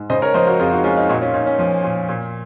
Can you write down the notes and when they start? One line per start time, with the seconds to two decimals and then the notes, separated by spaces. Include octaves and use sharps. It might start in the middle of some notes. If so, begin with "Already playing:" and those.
Already playing: G#2
0.10 C#3 C5 D#5
0.22 A#4 C#5
0.34 F3 C5 D#5
0.47 F#4 A#4
0.59 F2 F4 G#4
0.72 D#4 F#4
0.84 G#3 C#4 F4
0.97 D#4
1.09 A#2 D#4 F#4
1.21 C#4 F4
1.34 A#2 D#4
1.46 C#4
1.59 F3
1.84 A#2
2.09 A#2